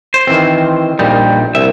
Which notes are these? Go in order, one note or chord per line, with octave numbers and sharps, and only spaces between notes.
C5
D#3 E3 C4
A#1 A#2 G3 D#4
C2 E5